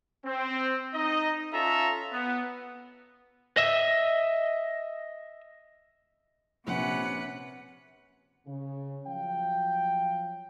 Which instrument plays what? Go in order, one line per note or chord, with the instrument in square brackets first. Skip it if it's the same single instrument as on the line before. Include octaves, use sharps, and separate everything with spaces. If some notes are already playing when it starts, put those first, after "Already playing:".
[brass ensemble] C4
D#4 D#5
C#4 F4 A4 E5 A#5
B3
[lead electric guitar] D#5 E5
[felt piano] A#1 [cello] C3 B4 [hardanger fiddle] C#4 F#5
[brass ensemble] C#3
F3 F#3 F5 G5